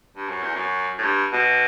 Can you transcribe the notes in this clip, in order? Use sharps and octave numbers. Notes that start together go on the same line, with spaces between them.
G2
F#2
E2
F#2
A2
G2
B2